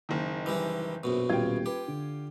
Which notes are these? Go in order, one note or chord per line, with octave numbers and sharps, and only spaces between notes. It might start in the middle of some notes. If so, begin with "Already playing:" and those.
F#1 D#3
E3 G3
A#1 F#2 B2
D#1 F4 G5 G#6
G4 B4
D3